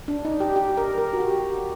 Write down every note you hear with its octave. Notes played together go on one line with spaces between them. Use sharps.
D4
D#4
G4
G4
A#4
A#4
F#4
G4